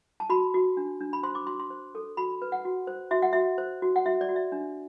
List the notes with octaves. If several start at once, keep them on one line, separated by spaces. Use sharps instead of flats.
A5
F#4 B5
F#4
D4
D4
B5
C5 C6
D6
F#4 C6
C6
C5
A4
F#4 B5
B4
F#5
F#4
C5
F#4 E5
F#5
F#4 E5
C5
F#4
F#5
F#4 E5
D5
F#4
E5
D4